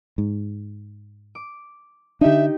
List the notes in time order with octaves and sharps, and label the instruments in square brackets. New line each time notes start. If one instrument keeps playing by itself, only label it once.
[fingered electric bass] G#2
[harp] D6
[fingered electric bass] D3 D4 [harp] D#4 G4 [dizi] E5